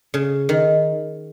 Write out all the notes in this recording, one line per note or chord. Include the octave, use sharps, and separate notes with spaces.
C#3
D#3